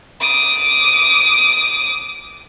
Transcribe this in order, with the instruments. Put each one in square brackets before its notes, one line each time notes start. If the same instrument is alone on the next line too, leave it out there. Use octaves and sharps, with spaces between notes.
[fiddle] D6 D#6